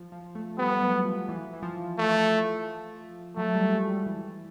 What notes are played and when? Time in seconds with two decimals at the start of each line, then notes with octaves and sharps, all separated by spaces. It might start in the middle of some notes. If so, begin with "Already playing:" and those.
Already playing: F3
0.12 F3
0.35 A3
0.58 G3 B3
0.82 F#3
1.05 F3
1.29 E3
1.53 E3
1.62 F3
1.98 A3
3.36 F#3 A3
3.55 G3
3.72 G#3
3.89 G3
4.06 E3